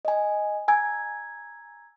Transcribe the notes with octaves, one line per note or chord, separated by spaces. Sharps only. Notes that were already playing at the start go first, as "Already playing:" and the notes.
D#5 G#5
G#5 A#5 E6 G#6